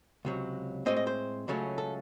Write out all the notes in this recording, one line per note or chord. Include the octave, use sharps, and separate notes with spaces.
C#2 C3 F#3
A2 G#3 C4 D#5
D#5
C5
C#2 C#3 F#3 A3 C#4
A4